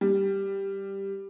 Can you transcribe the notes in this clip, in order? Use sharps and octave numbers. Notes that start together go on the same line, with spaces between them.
G3